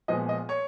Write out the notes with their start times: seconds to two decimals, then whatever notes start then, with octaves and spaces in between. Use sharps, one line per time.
0.08 A#2 F3 G#3 B3 D#5
0.29 D#5
0.49 C#5